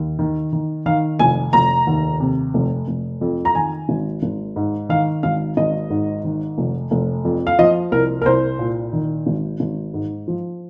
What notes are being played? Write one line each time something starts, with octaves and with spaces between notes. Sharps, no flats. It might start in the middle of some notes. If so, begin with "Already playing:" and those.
Already playing: D#2
D#3
D#3
D#3 F5
F1 G#5
F1 A#5
D#2
C3
F1
F1
F2
A#5
D#3 G#5
G#1
G#1
G#2
D#3 F5
G#1 F5
G#1 D#5
G#2
D#3
F1
F1
F2
F5
F3 D#5
C2 A#4
A#4
C2 C5
A#2
D#3
G#1
G#1
G#2
F3